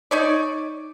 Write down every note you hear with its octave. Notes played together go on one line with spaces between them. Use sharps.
D#4 C#5 D5